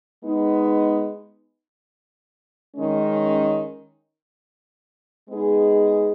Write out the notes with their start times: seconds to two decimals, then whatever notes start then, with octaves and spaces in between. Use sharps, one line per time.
0.23 G#3 B3 D#4
2.76 D#3 G#3 C#4
5.28 G#3 B3 D#4 G#4